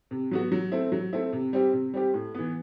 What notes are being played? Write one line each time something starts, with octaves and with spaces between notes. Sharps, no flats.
C3
F#3 B3 F#4
F#3
A3 C4 E4
F#3
A3 C4 E4
C3
G3 C4 G4
C3
G3 C4 G4
A2
E3 B3